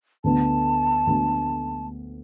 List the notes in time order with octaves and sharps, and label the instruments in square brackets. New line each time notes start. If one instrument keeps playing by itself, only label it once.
[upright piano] D2 D3 B3 [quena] A5
[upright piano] D2 D3 B3